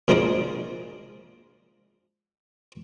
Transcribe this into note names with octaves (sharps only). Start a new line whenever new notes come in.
A#2 F3 G#3 D4 D#4 D#5